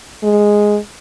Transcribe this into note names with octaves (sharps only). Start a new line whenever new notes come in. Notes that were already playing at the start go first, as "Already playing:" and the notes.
G#3